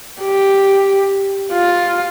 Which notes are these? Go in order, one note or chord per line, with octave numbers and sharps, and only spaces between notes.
G4
F4